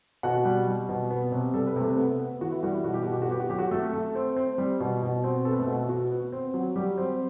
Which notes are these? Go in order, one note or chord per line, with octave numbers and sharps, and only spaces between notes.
B2 F#4 F#5
G3
G3
B2
B3
C3
G3 A4
B4
C3 A3 A4
B3
B3
E3 F#4
E4
G3 F#4
E4
B2 F#4
G4
B2 F#4
G4
F#4
B3 G4
F#4
F#3 G4
F#4
A3 A4
A3
C4
C4
G3
B2
B2
C4
B3 A4
B4
A3 A4
B2
B3 F#4
B3
C4
F#3
F#3 G3 G4
C4